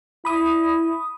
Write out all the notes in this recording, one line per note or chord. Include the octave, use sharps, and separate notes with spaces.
E4 B5 D#6